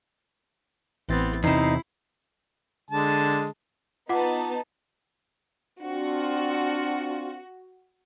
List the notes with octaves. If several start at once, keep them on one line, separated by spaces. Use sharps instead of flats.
A1 E3 B3 C4 A6
E2 C3 D#4 E4 C7
D3 G#3 A5
B3 D#4 F4 F#5 A5 D6
C4 D4 F4 F#4